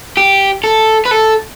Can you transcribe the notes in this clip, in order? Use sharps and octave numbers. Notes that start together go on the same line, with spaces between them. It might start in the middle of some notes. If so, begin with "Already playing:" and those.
G4
A4
B4
A4